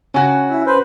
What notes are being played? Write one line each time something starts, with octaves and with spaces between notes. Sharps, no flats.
C#3 C#4 F#4
E4
B4 C5